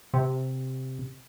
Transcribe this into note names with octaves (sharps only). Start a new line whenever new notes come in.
C3